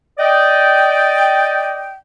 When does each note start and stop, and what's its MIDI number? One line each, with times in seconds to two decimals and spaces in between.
0.19 1.93 74
0.19 1.93 75
0.19 1.93 79